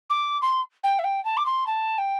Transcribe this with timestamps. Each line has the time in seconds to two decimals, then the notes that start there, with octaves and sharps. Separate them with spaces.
0.10 D6
0.42 C6
0.83 G5
0.99 E5
1.04 G5
1.25 A5
1.37 D6
1.46 C6
1.67 A5
1.98 G5